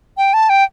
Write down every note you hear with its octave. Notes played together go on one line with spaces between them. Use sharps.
G5
A5
G5